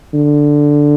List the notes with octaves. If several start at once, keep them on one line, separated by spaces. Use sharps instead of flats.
D3